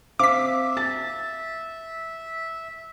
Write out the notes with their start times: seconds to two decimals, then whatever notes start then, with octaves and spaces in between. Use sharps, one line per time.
0.19 C4 C5 E5 F5 D6 B6
0.77 A6